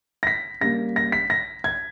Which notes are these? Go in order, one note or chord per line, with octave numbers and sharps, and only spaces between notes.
A#6
B6
C#3 G3 A#3 A#6
A#6
B6
A#6
G#6